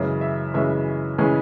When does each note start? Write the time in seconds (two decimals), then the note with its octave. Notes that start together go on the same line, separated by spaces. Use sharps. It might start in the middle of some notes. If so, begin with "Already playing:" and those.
Already playing: F#2 C#3 E3 G#3 C#4
0.21 E5
0.54 F#2 C#3 E3 G#3 C#4 E5
1.18 C#3 E3 G#3 C#4 G#5